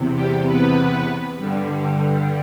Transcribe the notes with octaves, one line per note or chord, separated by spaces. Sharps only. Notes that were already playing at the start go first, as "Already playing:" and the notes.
Already playing: E2 C3
G3 G4
B3 B4
G2 D3 G3